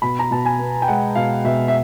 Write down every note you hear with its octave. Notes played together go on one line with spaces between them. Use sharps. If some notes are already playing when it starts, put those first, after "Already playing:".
B2 B5
A#5
B2 A5
G#5
B3
G5
G#3 F#5
B2 F5
B2 E5
E5